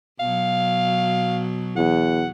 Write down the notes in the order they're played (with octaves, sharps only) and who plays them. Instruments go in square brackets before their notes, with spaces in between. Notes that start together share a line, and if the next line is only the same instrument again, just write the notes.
[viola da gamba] B2 F#3 [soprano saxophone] F5
[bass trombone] E2 [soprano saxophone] F#5